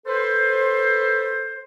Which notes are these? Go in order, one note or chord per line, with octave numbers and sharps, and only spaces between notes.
A4 B4 C5